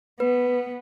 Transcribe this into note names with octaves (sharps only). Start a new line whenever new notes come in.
B3 B4